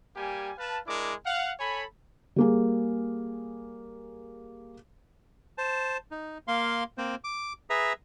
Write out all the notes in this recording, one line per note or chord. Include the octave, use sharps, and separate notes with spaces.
G3 A#3 G4 G#5
B4 F5 A5
G#3 D4 E4 A#4 D6
F5 F#5
A4 C#5 G#5 B5
G3 A#3 G#4
C5 A5
D#4
A#3 F5 C6
A#3 C4 C5
D6
G#4 B4 E5 A#5